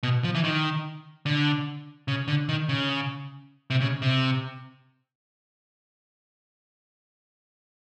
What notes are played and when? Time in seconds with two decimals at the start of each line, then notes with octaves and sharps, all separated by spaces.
0.03 B2
0.24 F3
0.35 E3
0.44 D#3
1.26 D3
2.08 C#3
2.28 D3
2.49 D#3
2.69 C#3
3.70 C3
3.81 C#3
4.02 C3